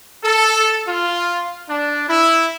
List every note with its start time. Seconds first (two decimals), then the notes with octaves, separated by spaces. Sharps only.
0.24 A4
0.88 F4
1.69 D4
2.08 E4